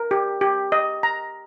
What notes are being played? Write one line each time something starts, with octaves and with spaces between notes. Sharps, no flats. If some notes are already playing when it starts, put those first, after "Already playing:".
Already playing: A#4
G4
G4
D#5
A#5